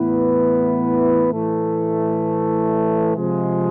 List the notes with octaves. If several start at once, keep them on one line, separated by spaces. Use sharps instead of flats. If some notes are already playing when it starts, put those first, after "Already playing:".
Already playing: A2 E3 B3 E4 B4
A2 E3 A3
C3 F3 G#3